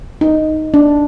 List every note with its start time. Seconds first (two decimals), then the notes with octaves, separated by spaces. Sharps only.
0.21 D#4
0.74 D4